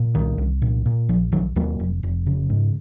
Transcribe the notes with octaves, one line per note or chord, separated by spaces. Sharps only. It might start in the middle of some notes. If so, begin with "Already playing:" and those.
Already playing: A#2
C2 D#3
C2
A#2
A#2
A#1 F3
A#1 D#3 F#3
D#2 F#3 A#3
F1
F1
C#3
G#2